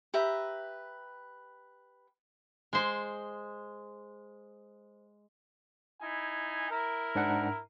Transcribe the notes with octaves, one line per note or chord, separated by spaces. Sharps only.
G4 B4 E5 A#5
G#3 C5
D#4 E4 G#5
E4 A#4
G#2 D4 F#5